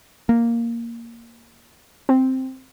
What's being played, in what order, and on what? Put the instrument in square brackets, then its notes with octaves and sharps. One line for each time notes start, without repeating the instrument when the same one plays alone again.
[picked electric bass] A#3
[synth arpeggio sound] C4